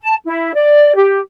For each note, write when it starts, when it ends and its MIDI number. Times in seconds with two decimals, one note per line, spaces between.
0.01 0.15 81
0.25 0.54 64
0.54 0.95 74
0.96 1.19 67